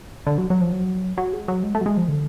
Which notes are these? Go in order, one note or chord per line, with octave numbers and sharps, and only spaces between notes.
D3
F#3
F#3
F3
F#3
F#3
G#3
F#3
G#3
A3
F#3
G#3
F3
D3